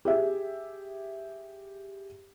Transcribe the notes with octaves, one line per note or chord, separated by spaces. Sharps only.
G4 G#4 E5